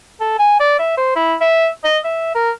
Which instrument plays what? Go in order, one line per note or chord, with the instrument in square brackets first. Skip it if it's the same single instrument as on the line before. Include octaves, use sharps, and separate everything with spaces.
[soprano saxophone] A4
G#5
D5
E5
C5
E4
E5
D#5
E5
A#4